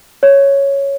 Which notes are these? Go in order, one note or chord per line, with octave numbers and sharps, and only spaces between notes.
C#5